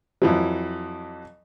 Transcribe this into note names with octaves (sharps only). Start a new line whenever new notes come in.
F2 E3 F#3